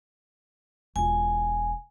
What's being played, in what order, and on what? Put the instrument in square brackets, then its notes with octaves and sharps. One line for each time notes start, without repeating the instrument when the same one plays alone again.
[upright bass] E1 F4 [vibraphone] G#5